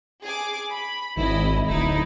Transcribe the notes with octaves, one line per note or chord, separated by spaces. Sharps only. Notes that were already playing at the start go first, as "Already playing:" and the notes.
G#4 G#5 D6
B5
G#1 E4 D#5
D1 D#4 E4